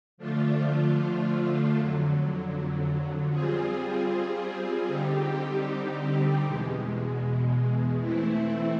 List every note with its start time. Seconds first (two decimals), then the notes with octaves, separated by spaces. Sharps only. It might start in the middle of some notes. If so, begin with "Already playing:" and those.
0.18 D3 F3 A3 D4 F4
1.74 F2 D3 F#3
3.30 G3 C4 F4 G#4
4.87 D3 G3 C4 D#4 G4
6.43 E2 B2 G#3
8.00 E3 A3 C4 E4